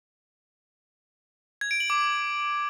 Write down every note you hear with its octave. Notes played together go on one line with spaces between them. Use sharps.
G#6
D7
F#7
D6